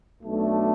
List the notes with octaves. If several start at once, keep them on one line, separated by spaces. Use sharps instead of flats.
B1 B2 A3 D4